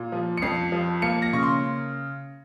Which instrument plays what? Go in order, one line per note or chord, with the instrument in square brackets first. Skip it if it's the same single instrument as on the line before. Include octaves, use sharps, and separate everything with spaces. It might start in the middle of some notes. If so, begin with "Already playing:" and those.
Already playing: [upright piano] A#2
F3
C#7
F2 C7
F3
A#3 C#7
A#6
C#3 C#6
C6